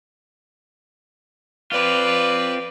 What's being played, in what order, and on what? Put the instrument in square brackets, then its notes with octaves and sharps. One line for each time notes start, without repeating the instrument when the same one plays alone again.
[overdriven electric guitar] C4 F4 [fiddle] B4 D5